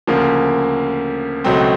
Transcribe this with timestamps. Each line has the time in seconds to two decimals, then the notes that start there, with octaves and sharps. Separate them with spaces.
0.07 D2 C#3 F3 A#3
1.44 C#2 B2 F#3 A3 C4